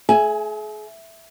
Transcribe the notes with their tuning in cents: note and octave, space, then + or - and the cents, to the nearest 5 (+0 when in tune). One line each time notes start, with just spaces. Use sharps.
G#4 +40 E5 +5 G#5 +0